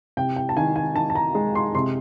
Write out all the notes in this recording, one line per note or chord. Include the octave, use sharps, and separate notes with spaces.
C3 G5
G5
A5
D#3 G#5
G#5
D#3 A5
A5
A#5
G#3
C6
C3 C6